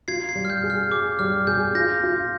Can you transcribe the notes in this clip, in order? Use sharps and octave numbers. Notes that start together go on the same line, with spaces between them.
F4 G#6 C7
G#6 C7
G3
F6
G6
G#4
F6
G#4 D6
G3 F6
G#4 G6
F4 G6 A#6
F4